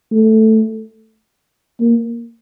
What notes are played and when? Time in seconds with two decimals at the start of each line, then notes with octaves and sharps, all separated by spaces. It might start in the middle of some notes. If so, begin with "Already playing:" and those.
0.12 A3
1.80 A#3